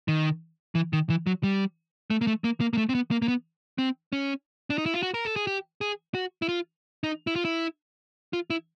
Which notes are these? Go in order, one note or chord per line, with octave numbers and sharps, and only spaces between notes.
D#3
E3
D#3
E3
F#3
G3
A3
A#3
A3
A#3
A#3
A#3
A3
C4
B3
A#3
A#3
B3
C4
C#4
D4
D#4
E4
F4
F#4
A#4
A4
G#4
G4
G#4
F#4
E4
F4
D#4
E4
F4
E4
F4
E4